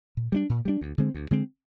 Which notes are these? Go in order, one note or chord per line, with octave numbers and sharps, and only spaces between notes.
A#2
G3 A#3 D4
A#2
G3 A#3 D4
D2
D3 G#3 C4
D2
D3 G#3 C4